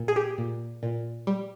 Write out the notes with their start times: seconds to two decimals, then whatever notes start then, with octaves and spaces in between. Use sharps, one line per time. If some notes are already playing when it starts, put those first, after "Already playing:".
Already playing: A#2
0.08 G#4
0.16 G4
0.38 A#2
0.83 A#2
1.27 G3